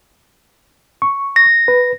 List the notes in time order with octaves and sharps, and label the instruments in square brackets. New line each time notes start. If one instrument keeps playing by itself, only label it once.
[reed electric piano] C#6
[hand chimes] A#6
[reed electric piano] B4